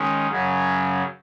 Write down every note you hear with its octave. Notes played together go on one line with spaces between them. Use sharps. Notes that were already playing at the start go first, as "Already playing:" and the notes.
Already playing: D#3 G#3 C#4
F#2 C#3 F#3 C#4